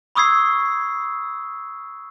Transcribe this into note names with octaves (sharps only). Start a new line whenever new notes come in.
B5 C#6 D#6 E6 G#6 C7